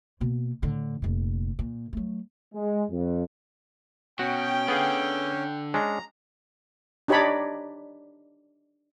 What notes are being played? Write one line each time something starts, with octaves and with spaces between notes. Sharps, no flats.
B2 A#3
A2 D3
F1 A#2
A#2
F#3 A3
G#3
F2
B2 C#4 F#4 G5
D3 B3 G#4 F5
G#3 C#4 D4 A#5
D4 D#4 G4 C#5 D5 B5